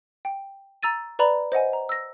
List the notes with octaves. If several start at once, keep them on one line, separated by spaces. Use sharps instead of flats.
G5
A#5 E6 A6 D#7
B4 D5 A#5 B5
C5 D#5 F#5 G#5
A#5
E6 A#6